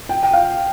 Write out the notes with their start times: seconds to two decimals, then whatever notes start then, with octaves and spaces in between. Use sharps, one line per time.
0.09 G5
0.23 G5
0.33 F5